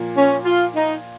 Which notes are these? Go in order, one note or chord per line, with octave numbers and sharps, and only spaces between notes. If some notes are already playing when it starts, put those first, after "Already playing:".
Already playing: A#2 F3 A#3
C#4
F4
D#4